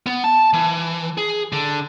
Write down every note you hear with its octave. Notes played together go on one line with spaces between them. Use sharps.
B3
A5
E3
G#4
D3